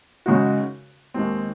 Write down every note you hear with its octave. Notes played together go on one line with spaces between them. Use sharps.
F#2 C#3 G#3 D#4 F#4
D#2 D#3 G#3 C4